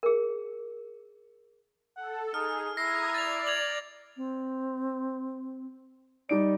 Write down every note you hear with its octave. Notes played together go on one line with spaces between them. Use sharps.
G#4 A#4
A4 F#5
D#4 G#4 F6
E4 A#5 D#6 G#6 A#6 C7
D5 A6 F7
G#6 F7 F#7
C4
G3 D#4 D5 D7